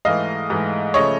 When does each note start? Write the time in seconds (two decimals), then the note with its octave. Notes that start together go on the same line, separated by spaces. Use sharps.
0.05 G#2 E3 A3 D#5 F5
0.50 G#2 E3 A3
0.94 C#3 F3 A3 C#5 D#5